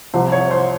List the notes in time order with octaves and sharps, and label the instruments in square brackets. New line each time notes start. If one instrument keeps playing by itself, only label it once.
[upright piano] C2 C3 F3 C5
C#5
C5